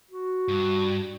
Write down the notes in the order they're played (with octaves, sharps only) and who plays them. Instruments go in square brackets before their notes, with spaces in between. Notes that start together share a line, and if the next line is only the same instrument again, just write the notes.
[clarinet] F#4
[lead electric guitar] G2